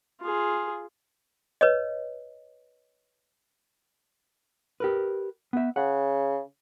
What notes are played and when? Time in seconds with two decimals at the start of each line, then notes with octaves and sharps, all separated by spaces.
0.21 F4 G#4
1.61 B4 C#5 D#5
4.80 G4 A#4 B4
5.53 B3 E5
5.76 C#3 F#5